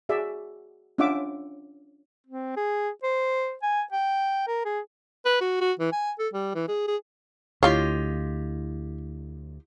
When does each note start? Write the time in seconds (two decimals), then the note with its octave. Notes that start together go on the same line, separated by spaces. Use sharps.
0.09 F#4 G#4 D5 E5
0.98 C#4 D4 F4 E5 F#5 D6
2.27 C4
2.56 G#4
3.03 C5
3.63 G#5
3.92 G5
4.47 A#4
4.65 G#4
5.25 B4
5.41 F#4
5.61 F#4
5.79 E3
5.92 G#5
6.19 A4
6.34 G3
6.55 E3
6.68 G#4
6.88 G#4
7.63 D2 E4 F4 G4 C#5 D#5 F5